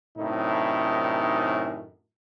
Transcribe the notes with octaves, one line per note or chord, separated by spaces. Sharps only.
F#2 A2 C3 D#3 D4 D#4